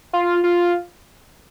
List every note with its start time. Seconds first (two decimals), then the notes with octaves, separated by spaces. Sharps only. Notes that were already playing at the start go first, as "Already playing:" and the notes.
0.13 F4
0.44 F4